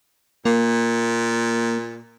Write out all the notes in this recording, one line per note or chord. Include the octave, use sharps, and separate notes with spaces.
A#2 A#3